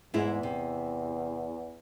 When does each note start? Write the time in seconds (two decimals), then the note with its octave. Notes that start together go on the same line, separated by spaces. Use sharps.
0.14 E2 G#2 E4 G#4
0.43 C3